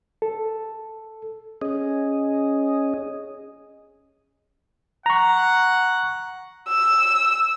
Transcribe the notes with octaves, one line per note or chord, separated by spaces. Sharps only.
A4
C#4 G#4 D#5
F#5 A#5 C#6
E6